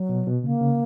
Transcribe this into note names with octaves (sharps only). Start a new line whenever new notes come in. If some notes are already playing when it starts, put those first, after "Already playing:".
Already playing: F#3
B2
B2
C#3 A#3
C#3